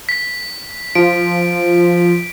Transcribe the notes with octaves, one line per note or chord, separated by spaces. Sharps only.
B6
F3 D7